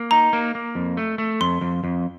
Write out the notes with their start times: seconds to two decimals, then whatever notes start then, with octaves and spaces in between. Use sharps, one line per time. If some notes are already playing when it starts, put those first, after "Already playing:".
Already playing: A#3
0.11 D#4 A#5
0.33 A#3
0.55 A#3
0.75 F2
0.97 A3
1.18 A3
1.41 F2 C6
1.61 F2
1.84 F2